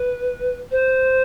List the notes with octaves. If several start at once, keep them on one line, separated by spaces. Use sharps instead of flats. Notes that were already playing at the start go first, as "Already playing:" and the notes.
Already playing: B4
C5